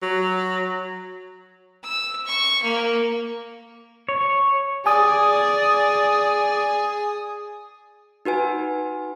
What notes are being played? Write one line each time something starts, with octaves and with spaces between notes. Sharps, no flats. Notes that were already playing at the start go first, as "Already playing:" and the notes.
F#3
E6
C#6
A#3
C#5
G#4 D5 G#5 D#6
D#4 F#4 B4 G#5